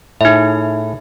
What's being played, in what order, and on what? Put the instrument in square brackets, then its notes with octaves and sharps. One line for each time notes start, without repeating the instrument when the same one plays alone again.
[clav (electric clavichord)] A2 G#4 [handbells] D#4 E5